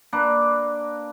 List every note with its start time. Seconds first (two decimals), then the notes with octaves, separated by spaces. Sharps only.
0.13 A#3 D4 B4